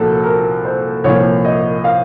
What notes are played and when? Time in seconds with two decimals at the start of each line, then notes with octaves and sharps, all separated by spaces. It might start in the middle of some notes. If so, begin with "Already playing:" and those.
Already playing: C2 A#2 F3 F#4 A4
0.23 A#4
0.64 C5
1.04 C2 A#2 F3 C#5
1.44 D#5
1.84 F5